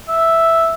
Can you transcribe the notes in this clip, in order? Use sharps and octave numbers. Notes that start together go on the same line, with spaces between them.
E5